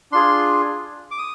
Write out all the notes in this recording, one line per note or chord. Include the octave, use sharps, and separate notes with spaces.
D4 F4 G#4 C6
D6
D#6